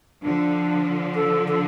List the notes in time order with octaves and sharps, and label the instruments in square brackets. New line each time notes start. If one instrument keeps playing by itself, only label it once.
[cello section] D3 F3 [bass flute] D4
[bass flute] A4
A4